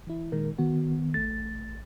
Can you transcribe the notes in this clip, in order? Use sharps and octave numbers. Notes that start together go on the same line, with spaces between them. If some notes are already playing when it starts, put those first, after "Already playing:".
E3 E4
A#2 D#3 G#3 A#4
D#3 B3 F#4
A1 A3 A6